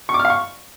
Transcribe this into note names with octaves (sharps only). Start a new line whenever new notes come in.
C#6
D6
F6
F5
C#6